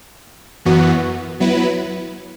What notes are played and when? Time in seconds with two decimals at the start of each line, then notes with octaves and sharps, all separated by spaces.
0.65 F#2 E3 B3 F#4
1.40 F#3 B3 E4 B4